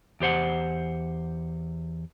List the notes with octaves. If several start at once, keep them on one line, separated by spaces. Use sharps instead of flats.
E2 G4 C5 F#5